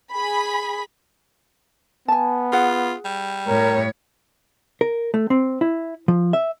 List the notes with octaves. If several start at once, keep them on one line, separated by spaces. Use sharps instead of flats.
G#4 B5
B3 G#5 A5
F4 G#4 F#5
G3
A2 A#4 C#5
A#4
A3
C4
E4
F3
E5